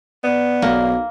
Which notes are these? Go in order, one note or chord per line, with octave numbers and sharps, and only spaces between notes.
B3 D5
B1 A#3